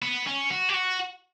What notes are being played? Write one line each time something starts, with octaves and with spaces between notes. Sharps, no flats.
B3
C#4
F#4
G4
F#4